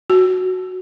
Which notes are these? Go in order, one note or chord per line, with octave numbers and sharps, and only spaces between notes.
F#4